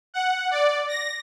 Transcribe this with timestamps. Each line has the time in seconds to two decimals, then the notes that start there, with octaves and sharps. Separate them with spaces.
0.14 F#5
0.51 D5
0.88 A#6